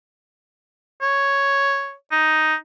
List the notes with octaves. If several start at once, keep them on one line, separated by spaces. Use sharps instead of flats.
C#5
D#4